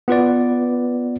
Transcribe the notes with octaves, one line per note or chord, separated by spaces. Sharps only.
B3 F4 B4 D5